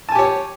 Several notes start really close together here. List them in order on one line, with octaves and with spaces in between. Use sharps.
A5 G#5 G4 C#5